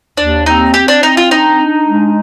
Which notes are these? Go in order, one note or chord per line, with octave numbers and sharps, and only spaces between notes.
D#2 D4
C4 D#4
C4 G4
D4
C4 D#4
F4
D4 D#4
D4
G#3